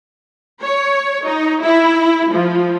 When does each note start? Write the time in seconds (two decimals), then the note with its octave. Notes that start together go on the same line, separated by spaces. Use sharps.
0.62 C#5
1.25 D#4
1.62 E4
2.32 F3